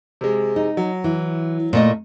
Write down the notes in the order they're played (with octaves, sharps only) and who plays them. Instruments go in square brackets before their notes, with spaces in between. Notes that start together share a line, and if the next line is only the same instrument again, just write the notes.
[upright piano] C3 G#3
[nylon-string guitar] D#4
[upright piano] F#3
[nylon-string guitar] E3
A#2 A3 D#5